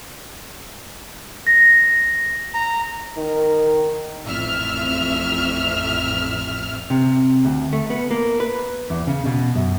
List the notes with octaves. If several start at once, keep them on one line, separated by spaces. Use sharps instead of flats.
A#6
A#5
D#3
A1 F2 E5 F6
C3
D2
A3
B3
A#3
B4
E2
C#3
B2
F#2